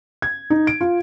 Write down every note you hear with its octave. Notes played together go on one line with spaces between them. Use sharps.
G#6
D#4
D7
F4